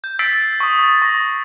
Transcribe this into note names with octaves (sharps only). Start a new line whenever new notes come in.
G6
E6 A6 B6 C7 D7
C#6 D#6
A6
C#6 A#6